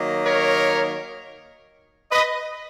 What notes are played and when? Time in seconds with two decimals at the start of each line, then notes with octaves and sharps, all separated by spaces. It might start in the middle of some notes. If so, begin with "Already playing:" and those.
Already playing: D#3 F#3 A#3
0.25 A#4 C#5
2.11 B4 D#5